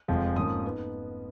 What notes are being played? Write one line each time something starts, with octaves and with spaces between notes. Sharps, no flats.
F1 F2 F3 G#3
G#2 F3 A#3 C#4 D#6
B3 D#4